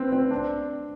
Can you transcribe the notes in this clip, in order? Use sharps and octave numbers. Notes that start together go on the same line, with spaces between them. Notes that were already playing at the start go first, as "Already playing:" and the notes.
Already playing: C4 B4
C4
D4